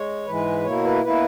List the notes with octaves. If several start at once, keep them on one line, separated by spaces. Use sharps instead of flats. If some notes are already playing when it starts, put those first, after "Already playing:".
Already playing: G#3 C#5
G#2 E3 G#3 B4
B2 A#3 E4 C#5
B4
B2 A#3 E4 B4